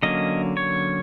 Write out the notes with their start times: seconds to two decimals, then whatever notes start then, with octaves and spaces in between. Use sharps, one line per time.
0.03 D3 F#3 A#3 C#4 D#5
0.57 C#5